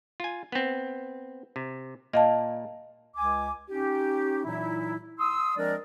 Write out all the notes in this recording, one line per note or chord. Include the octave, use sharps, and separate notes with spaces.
F4 G#5
B3 C4
C3
A#2 A#3 D#5 F5 A5
C#2 G#5 D6
C#4 D#4 G4
A#2 E3 F#3 D#4 E4
C6 D#6 E6
F3 G#3 C4 D4 A#4 D5